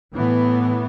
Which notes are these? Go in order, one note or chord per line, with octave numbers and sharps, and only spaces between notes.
A2 E3 B3